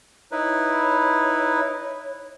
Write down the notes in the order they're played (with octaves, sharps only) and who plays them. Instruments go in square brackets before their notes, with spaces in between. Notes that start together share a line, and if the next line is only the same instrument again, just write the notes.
[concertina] D#4 E4 B4 [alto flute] C#5